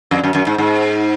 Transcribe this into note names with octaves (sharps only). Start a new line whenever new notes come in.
F2
F#2
F#2
G#2
G#2